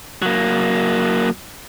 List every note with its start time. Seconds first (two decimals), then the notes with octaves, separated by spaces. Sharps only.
0.22 F#3 A#3